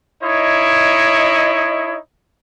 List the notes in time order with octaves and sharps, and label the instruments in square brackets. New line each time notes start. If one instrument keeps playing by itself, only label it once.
[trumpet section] D#4 E4 C#5 D#5